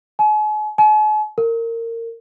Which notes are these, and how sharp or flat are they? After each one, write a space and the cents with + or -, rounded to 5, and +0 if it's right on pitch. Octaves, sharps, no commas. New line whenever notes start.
G#5 +40
G#5 +45
A#4 -25